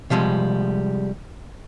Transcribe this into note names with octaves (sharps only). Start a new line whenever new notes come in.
C3 F3 G3 G#3